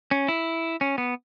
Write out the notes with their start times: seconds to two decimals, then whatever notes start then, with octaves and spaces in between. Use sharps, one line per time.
0.11 C#4
0.28 E4
0.81 C#4
0.98 B3